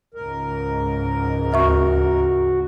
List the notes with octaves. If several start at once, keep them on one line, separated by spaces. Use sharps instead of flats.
C#2 G#2 A#4
D2 F#4 E5 C#6